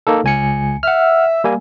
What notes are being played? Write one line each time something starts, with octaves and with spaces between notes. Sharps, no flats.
A#3 D#4 A4
C#2 G#5 C#7
E5 F#5 F6
G3 A#3 G#5